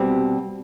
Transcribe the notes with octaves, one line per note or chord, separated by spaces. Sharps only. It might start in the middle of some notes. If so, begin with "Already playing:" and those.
Already playing: B2 G3 C4